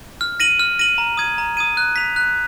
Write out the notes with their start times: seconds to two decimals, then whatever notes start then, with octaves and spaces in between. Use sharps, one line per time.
0.21 F6
0.40 A#6 D#7 F#7
0.59 F6
0.79 A#6 D#7 F#7
0.98 A#5
1.17 D#6 G#6 D#7
1.38 A#5
1.57 D#6 G#6 D#7
1.77 F#6
1.96 B6 F7
2.16 F#6